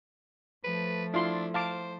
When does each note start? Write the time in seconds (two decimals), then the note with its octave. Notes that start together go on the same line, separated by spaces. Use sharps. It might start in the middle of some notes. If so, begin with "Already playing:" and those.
0.64 F3 A3 B4
1.14 D4 E4 F4 C6
1.54 C5 F5 A5 D6